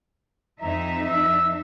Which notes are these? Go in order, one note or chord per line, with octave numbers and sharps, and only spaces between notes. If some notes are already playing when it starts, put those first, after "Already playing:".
F2 D#4 E5 A#5
E6